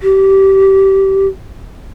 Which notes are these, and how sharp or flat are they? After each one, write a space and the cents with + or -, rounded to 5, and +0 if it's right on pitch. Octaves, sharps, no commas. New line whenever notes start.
G4 -20